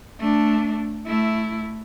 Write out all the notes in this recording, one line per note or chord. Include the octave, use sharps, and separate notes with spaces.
A3 D4
A3 E4